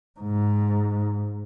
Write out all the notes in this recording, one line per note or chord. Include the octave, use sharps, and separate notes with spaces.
G#2